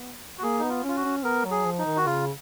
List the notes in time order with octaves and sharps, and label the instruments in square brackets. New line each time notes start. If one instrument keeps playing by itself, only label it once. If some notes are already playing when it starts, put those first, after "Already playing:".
Already playing: [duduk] B3
[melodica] F#4
[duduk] A#3 [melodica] G#4
[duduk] B3 [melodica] D#4
[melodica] F4
[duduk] C#4 [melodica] F4
[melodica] F#4
[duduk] C#4
[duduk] B3 [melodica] A#4
[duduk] F#3
[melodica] G#4
[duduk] F3
[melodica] D#4
[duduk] D#3
[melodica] F#4
[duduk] C#3 [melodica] F4